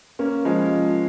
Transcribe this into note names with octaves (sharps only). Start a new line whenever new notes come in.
A#3 C#4
F3 G#3